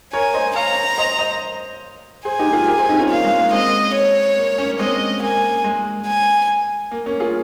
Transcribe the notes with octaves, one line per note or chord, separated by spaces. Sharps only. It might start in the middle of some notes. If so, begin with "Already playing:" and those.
A#4 C#5 G#5
C5 D#5
C#5 F5 A#5
C5 D#5
C5 D#5
G#4 C5 G#5
D#4 G4
F4 G#4
G4 A#4
G#4 C5
C4 D#4
C#4 F4
A#3 F5
G#3
A#3
G#3 C4 D#5
C#5
A#3
A#3 C#4
G#3 C4 D#5
A#3 G#5
G#3
G#5
A#3
A#3 C#4
F4 G#4